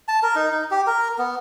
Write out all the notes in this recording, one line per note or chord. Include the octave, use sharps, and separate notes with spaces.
A5
A#4
D#4
D#4
G4
A#4
B3